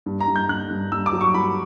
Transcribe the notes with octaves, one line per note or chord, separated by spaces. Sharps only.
G2
A#5
G2
G6
G2 F#6
G2
G2 E6
D6
F#3
C#6
G2 B5